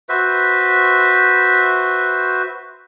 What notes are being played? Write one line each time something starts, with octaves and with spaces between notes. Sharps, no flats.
F#4 B4 C5 E5